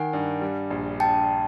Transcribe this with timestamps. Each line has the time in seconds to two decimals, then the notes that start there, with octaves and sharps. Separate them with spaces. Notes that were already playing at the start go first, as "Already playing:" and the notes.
Already playing: D#3 F#5 G#5
0.13 G2
0.41 G3
0.70 A#1
1.00 G5 A5